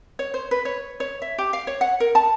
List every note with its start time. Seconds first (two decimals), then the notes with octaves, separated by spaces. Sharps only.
0.19 C#5
0.34 C5
0.51 B4
0.65 C#5
1.00 C#5
1.22 E5
1.38 G4
1.53 F5
1.67 C#5
1.81 F#5
2.00 A#4
2.15 A5